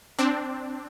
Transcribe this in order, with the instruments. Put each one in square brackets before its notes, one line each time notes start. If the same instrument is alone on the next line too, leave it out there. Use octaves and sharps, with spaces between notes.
[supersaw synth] C4 D4